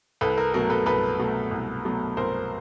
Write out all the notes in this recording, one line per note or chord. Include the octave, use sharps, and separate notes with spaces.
C2 A4 B4
A#4
B2 F#3 A3 A#4
A4 B4
C2 A4 B4
B2 F#3 A3
C2
B2 F#3 A3
C2 A#4 C5